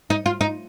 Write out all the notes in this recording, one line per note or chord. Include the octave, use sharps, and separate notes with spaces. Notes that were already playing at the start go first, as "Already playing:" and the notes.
D#4
F4
D#4